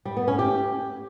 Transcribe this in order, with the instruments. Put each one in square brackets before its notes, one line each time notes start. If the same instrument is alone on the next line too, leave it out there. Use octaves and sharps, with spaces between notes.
[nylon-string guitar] G3
B3
C#4
G4